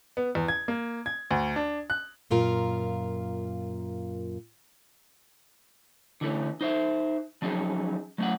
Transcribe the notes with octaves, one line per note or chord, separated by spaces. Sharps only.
B3
E2
G#6
A#3
G#6
D2
D4
F#6
F#2 A#2 F4 A#4
D3 E3 A3 C#4
D#4 C5 E5
F3 F#3 C#4 D#4 G#4
F#3 A3 B3 C#4 F#5